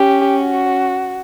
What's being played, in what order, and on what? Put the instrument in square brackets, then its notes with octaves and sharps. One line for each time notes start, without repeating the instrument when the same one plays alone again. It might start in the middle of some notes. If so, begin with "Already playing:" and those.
Already playing: [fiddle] C#4 [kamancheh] G4
[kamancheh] F#4